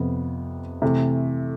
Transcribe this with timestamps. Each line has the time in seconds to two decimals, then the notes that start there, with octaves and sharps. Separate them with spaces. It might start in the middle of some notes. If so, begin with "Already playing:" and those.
Already playing: F2 C3 F3 B3
0.82 C3 E3 A3